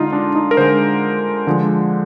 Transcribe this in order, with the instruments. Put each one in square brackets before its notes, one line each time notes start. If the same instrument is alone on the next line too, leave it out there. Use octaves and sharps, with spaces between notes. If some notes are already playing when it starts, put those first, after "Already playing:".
Already playing: [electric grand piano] D3 G#3 D#4 F4
D4
D#4
A#4
D3 G#3 C5
D3 F3 G#3